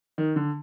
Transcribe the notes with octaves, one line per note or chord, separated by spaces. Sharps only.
D#3
D3